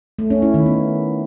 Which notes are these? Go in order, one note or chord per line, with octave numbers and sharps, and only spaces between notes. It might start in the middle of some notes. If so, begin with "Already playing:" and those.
A3
C#4
E4
D#3
B3